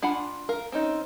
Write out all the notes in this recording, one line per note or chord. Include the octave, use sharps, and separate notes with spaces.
D4 F4 F#5 G#5 B5
A#4 F5
C4 C#4 D#4